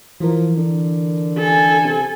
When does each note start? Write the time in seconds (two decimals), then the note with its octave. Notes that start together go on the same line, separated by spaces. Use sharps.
0.20 E3 F3 A#4
0.57 D3
1.38 A4 G#5
1.83 C3